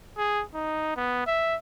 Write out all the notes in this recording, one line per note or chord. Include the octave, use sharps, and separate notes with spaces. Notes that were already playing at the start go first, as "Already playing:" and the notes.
G#4
D#4
B3
E5